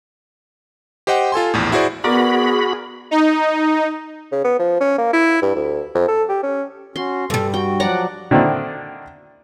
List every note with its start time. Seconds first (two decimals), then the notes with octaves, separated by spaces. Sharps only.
1.07 G4 C5 D#5 F#5 G5
1.32 F4 A4 G#5 C6
1.54 A#1 E2 A2
1.72 E4 F#4 G#4 C5 D5
2.04 B3 F#4 G#4 A#4 D5 B5
3.11 D#4
4.32 C#3
4.44 B3
4.59 F3
4.81 C#4
4.98 A#3
5.13 E4
5.42 G2
5.55 D2
5.95 F2
6.08 A4
6.29 G4
6.43 C#4
6.96 C#4 F#4 C6
7.30 G2 G3 A4
7.54 F#4 G5
7.80 F3 F#3 D5 F#5 A#5
8.31 D3 D#3 C4 D4 E4